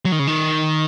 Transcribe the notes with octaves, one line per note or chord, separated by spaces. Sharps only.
F#3
D#3
C#3
D#3